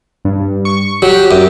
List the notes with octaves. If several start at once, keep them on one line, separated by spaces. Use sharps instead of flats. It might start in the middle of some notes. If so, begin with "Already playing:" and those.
G2
C#6
F#3 G4
F#2 G4